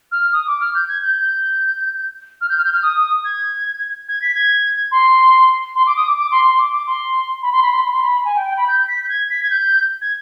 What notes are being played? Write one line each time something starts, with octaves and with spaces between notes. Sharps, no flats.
F6
D#6
D6
F6
G6
G#6
G6
G6
F6
G6
F6
G6
F6
D#6
D#6
D#6
G#6
G#6
B6
G#6
C6
C6
D6
D#6
D6
D6
C6
C6
D6
D6
C6
B5
C6
B5
C6
B5
C6
B5
B5
G#5
G5
G5
B5
G6
B6
G6
G#6
B6
G#6
G6
G#6